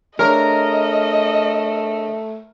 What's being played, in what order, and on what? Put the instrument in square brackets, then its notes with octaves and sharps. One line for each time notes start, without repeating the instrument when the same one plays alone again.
[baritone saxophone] A3 [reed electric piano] D4 G#4 C#5 [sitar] A#4 [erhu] D#5